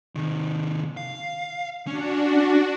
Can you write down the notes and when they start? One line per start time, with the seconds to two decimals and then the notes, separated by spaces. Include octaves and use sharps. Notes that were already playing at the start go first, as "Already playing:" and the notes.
0.15 C3 D#3
0.97 F5
1.87 C#4 D4 F#4